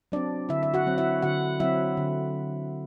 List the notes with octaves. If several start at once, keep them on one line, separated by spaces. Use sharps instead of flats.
F#3 C4 D4 D5
D3 E4 E5
E5
F#4 F#5
F#3 C4
E4 E5
D3 F#4 F#5
F#3 C4 E4 E5
D3